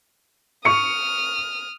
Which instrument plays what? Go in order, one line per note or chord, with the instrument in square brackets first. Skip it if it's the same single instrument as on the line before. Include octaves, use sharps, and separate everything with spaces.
[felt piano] C#6 C#7 [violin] D#6 F6